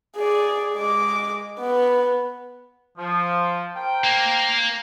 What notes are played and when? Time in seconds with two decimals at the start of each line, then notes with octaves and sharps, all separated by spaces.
0.16 G#4 D5
0.75 G#3 D6
1.60 B3
2.97 F3
3.76 A#4 C5 G5
4.04 A#3